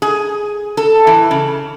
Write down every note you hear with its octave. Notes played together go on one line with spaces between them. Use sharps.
G#4
A4
E3
C#3